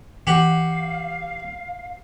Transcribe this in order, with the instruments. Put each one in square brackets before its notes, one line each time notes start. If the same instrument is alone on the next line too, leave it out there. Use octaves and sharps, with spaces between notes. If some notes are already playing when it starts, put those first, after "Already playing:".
[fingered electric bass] E3 [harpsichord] F#4 G4 [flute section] F5